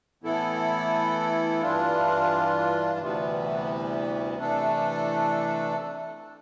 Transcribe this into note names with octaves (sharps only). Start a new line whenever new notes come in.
A2 E3 B3 E4 A4
G2 E3 G3 D4 F4
D2 C3 E3 G3 B3
C3 E3 A3 D4 A4